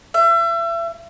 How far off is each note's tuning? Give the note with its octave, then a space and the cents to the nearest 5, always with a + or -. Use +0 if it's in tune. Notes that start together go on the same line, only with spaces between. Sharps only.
E5 +35